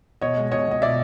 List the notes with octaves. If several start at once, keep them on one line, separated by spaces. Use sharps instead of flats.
B2 C#5 D#5
G#3
B2 C#5 D#5
B2 D#5
B2 D5 E5